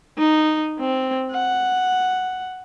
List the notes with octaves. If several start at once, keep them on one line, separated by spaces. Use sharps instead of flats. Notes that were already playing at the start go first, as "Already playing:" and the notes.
D#4
C4
F#5